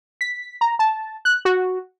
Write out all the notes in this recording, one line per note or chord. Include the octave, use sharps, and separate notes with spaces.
B6
A#5
A5
F#6
F#4